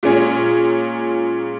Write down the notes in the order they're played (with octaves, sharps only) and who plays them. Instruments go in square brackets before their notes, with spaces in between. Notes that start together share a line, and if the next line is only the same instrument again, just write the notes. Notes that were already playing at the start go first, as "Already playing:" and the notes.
[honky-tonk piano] A#2 G#3 C#4 G#4